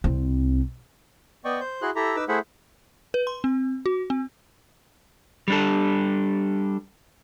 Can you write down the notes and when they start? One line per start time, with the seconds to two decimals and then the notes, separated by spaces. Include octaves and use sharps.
0.04 C2 C4
1.45 B3 D5 D#5 G5 C#6
1.60 C5 G6
1.82 E4 F#4 G#4 C6 F#6
1.96 E4 G4 A4 E5 A#5
2.16 D#4 B4 D6 E6
2.28 A3 E4 G#4 C5 E5 F#5
3.14 B4
3.27 C6
3.44 C4
3.86 F#4
4.10 C4
5.48 G3 D4 A4